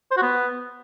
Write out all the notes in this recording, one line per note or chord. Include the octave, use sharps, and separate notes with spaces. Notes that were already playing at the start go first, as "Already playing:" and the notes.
C5
F#4
B3